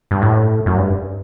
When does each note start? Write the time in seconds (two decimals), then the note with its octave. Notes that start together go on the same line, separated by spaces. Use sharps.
0.11 G2
0.22 A2
0.66 F#2
0.77 G2